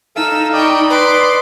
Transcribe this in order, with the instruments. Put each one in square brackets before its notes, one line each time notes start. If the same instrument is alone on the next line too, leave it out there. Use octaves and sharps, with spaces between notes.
[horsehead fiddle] D#4 [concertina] A4 E5 F5 [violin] E6
[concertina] D5 D#5 B5 [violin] G5 C#6
[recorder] B4 [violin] C6 D6